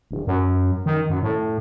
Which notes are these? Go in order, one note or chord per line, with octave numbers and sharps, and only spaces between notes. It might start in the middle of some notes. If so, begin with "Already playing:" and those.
D1
F#2
D#3
F#2
A2